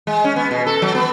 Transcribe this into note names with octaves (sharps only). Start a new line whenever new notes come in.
G#3
C#4
B3
B2
A4
F#3
B3